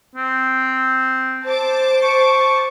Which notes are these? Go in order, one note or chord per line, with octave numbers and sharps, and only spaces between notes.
C4
C5 A5 D6
C#6